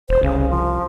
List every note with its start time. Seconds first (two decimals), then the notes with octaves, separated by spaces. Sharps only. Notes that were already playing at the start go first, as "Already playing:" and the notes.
0.09 E1 C5
0.23 C2 C#3
0.50 F3